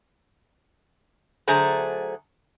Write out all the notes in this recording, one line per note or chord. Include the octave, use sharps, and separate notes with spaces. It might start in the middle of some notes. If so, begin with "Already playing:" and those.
D3 F#3 A3 G#4 C5 A#5